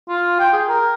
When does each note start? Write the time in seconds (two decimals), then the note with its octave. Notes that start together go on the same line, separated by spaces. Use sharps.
0.09 F4
0.39 G5
0.53 G#4
0.69 A#4